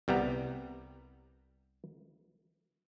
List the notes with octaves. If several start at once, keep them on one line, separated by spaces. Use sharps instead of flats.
C2 G3 B3 A#5